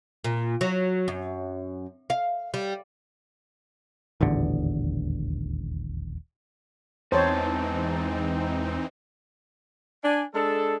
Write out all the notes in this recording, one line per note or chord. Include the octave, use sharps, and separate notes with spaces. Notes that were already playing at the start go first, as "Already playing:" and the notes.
A#2
F#3
F#2
F5
G3
D#1 A1 E2 D3
E2 G#2 E3 C4 D#4 C5 C#5 A5
D4 G#5
G#3 D4 G#4 A4